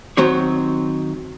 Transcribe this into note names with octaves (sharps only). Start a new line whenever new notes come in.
D#3 F#3 C4 C#5